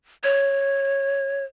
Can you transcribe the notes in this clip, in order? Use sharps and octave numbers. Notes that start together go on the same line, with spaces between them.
C#5